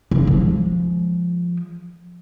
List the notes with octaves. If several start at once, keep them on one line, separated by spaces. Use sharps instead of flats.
C#3
F3 G#3